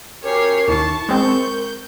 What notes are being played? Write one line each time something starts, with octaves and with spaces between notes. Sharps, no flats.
C#4 F#4 G4 A#4 C#5 C7
D#2 E4 A5 C#6
G#3 C4 A#4 G6